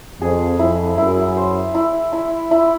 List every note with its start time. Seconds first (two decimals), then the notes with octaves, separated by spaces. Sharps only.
0.21 F2 G#4
0.59 F2 E4
0.98 F#2 E4
1.36 C5
1.75 E4
2.13 E4
2.51 E4